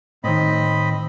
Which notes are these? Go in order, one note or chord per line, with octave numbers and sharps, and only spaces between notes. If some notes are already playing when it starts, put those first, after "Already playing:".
A2 D#3 C4 D#5 B5